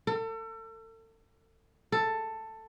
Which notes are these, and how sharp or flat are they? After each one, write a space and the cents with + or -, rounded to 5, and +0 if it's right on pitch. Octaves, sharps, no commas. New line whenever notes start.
A4 +35
A4 +10